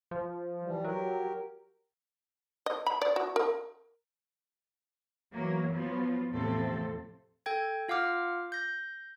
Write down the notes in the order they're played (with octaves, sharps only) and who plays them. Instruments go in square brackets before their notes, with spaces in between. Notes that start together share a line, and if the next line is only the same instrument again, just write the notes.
[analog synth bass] F3
[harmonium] E3 G3
[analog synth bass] F#3 [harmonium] G4 A#4
[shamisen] D#5
B5
D5
F#4
A#4
[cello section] E3 F#3 A#3
F3 F#3 B3 F4
E2 A2 C3 F3 C4 A4
[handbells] A4 G5 G#6
F4 F5 F#5 D6 F6
G6 A#6